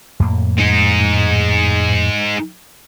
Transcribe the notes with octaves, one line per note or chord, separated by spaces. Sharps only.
F2 A2 A#3
G#3 D#4